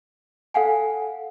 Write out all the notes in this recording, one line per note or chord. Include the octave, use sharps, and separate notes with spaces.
A4 F5 F#5 G#5